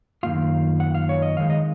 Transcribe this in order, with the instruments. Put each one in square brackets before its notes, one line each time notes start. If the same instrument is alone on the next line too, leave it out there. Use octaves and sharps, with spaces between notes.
[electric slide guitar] F#2 D#3 A#3 F4 F5
F#5
F5
C#5
D#5
F2 D#3 G#3 D#4 F5
D#5